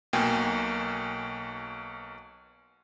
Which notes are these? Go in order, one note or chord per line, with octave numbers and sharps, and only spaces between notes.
B1 B2 A#3 G5 G#5